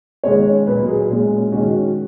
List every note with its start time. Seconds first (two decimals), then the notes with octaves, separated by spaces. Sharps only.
0.24 D#3 G#3 C#4 C#5
0.67 A#2 F#3 A#3 B4
0.88 G#4
1.09 A#2 G#3 C#4
1.52 D#3 G#3 C#4 F#4